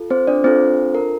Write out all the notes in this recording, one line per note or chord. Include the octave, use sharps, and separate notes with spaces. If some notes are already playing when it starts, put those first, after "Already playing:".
Already playing: F4 A4
C4 C5
D4 D5
C4 D4 F4 A4 C5
A#4